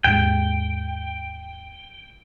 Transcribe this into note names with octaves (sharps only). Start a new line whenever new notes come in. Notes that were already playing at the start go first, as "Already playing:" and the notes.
D#2 G#2 G#3 G5